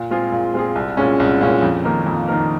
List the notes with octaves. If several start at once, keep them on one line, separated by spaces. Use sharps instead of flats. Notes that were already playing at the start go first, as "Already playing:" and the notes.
Already playing: A#2
G#3 C4 F4 G#4
A#2
G#3 C4 F4 G#4
C2
A#2 G#3 C#4
C2
A#2 G#3 C#4
F2
D#3 A#3 D#4 A#4
F2
D#3 A#3 D#4 A#4